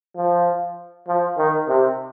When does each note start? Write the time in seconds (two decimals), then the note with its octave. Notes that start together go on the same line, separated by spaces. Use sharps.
0.16 F3
1.08 F3
1.38 D#3
1.68 C3